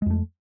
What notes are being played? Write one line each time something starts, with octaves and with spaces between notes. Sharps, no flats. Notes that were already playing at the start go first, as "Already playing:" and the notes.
F2 G#3 A3